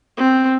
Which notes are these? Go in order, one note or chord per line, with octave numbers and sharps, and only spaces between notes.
C4